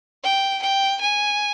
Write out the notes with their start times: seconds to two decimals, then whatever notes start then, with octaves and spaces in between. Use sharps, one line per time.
0.24 G5
0.62 G5
1.01 G#5